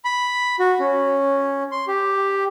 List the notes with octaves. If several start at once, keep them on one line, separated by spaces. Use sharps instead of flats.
B5
F#4
C#4
C6
G4